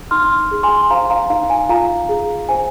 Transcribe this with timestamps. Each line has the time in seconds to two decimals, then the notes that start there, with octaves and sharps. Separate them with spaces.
0.11 D#4 C6 F6
0.51 G#4
0.63 G#5 C6
0.90 C5 F5 A#5
1.10 F5 A#5
1.30 D#4 F5
1.50 G#5
1.69 F4 F5 A#5
2.09 G#4
2.49 C5 G#5